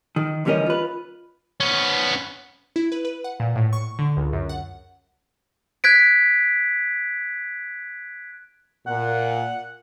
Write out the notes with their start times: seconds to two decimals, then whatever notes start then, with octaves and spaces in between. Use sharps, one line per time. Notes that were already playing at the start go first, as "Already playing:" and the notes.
0.16 D#3
0.45 D2 E3 G3 C#4 A#4 D#5
0.66 F4 B4
1.60 B3 C#4
2.76 E4
2.92 B4
3.05 B4
3.24 F#5
3.40 A#2
3.56 A2
3.73 C#6
3.99 D3
4.17 C#2
4.33 F#2
4.49 F#5
5.84 F#6 G#6 B6 D7
8.87 A#2 F#5